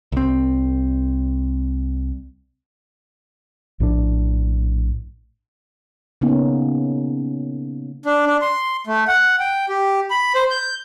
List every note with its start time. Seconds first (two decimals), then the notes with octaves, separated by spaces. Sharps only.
0.12 C2 C4
3.80 A#1 A2 C#3 D4
6.21 C#3 A#3 B3 C#4 D#4
8.05 D4
8.27 D4
8.41 C6
8.87 A3
9.08 F#5
9.40 G5
9.69 G4
10.10 B5
10.35 C5
10.51 G6